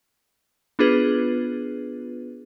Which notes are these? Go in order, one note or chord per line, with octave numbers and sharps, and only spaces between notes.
B3 D4 F4 G#4 B4